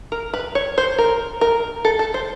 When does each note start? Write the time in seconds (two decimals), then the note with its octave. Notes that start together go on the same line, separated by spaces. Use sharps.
0.12 A#4
0.34 B4
0.55 C#5
0.78 C5
0.98 A#4
1.41 A#4
1.85 A4
1.99 A4
2.14 C5